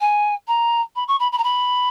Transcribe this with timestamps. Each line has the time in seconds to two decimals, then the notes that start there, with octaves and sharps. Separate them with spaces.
0.01 G#5
0.48 A#5
0.96 B5
1.08 C#6
1.20 B5
1.32 B5
1.38 A#5
1.44 B5